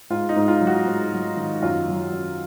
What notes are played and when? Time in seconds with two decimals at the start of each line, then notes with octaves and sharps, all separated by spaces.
0.10 G#2 F4
0.29 D#4
0.36 G#2
0.48 F4
0.61 F#3
0.67 F#4
0.86 G#2
1.12 F#3
1.37 D#3
1.62 F#2 F4
1.88 F#3
2.13 F#2